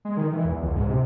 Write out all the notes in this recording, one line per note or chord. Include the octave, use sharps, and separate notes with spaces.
G#3
D#3
E3
E2
C#2
G#2
C3